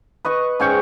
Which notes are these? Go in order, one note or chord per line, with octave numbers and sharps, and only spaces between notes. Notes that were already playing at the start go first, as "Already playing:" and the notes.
B4 D#5 C#6
G#2 C#4 G5 C#6